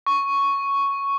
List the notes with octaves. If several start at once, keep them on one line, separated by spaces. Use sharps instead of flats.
C#6